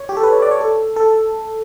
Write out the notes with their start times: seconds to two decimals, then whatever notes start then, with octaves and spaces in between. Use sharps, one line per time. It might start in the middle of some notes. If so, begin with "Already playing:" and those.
Already playing: C#5
0.09 G4
0.17 A4
0.23 B4
0.33 C#5
0.42 D5
0.51 C#5
0.61 A4
0.96 A4